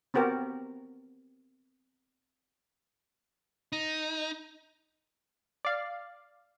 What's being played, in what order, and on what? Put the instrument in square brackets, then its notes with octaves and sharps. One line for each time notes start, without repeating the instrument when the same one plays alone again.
[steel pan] B3 C4 F#4 G4 A#4
[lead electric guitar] D#4
[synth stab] D5 F5